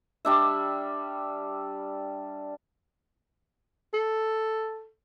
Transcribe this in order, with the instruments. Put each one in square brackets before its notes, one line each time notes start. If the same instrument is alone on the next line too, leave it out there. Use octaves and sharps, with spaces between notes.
[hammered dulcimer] G3 D4 E5
[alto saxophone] A4